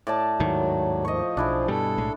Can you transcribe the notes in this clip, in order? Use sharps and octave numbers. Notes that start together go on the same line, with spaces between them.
A2 D5 A5
D#2 G#2 D#3 F#3
F3 D#5 C#6
B1 D4 E4 G#4
G2 B2 G3 A4
B1 A2 G#3